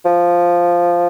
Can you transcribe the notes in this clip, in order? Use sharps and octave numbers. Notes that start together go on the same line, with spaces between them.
F3